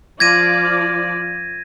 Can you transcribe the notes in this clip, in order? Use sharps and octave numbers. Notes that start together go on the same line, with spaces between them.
F3 F4 D5 G#6 A#6 D#7